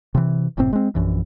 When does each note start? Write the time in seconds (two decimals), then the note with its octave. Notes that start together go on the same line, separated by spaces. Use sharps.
0.15 C3 E3
0.57 F#1 A2 C3 C4
0.73 G#3 C4
0.95 A#1 F#2 E3